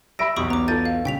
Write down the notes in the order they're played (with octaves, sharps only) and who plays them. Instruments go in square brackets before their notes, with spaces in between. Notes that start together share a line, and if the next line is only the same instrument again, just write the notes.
[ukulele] G4 E5 B5 [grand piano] E6 D7 [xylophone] A#6
[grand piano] B1 E2 [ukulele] G4 [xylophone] B5 C#6 D#6
[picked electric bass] B3 [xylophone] A#5 D6
[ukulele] D#4 F4 A4 [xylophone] G6 A6 D#7
[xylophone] F5
[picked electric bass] G2 A#2 C#3 [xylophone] G5 B6 F7